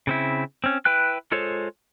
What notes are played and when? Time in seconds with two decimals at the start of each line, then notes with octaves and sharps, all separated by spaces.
0.07 C#3 C4 E4
0.64 C4 C#4
0.85 E4 B4 G5 F#6
1.32 G#3 F4 A4 C5 C#5